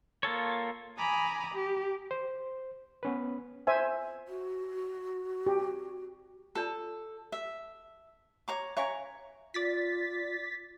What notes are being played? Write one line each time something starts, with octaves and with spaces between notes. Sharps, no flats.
A#3 F4 A4 C#5
G#5 A#5 B5 D6 D#6
G4
C5
B3 C#4 B4
C5 E5 G#5
F#4
G4
F4 A4 D5 A5
E5
C#5 A#5 D6
C#5 E5 F5 G#5 A#5 C#6
F4 D5 A6 B6